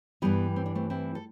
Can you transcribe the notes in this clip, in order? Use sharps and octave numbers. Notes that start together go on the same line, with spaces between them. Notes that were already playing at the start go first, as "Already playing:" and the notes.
G2 E3 G3 B3
C4
D4
A3 C4
C4 E4
A4